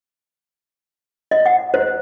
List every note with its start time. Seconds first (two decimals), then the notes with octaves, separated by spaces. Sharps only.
1.31 D#5
1.46 F#5
1.74 C5